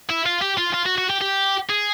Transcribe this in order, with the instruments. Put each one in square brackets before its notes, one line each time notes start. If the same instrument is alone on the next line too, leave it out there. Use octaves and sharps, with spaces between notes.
[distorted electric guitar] E4
F4
G4
F4
F4
F#4
F#4
G4
G4
G#4